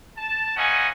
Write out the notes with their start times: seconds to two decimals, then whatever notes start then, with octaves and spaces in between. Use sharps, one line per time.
0.18 A5
0.56 A#3 C#4 E4 D#5 F#5 G#5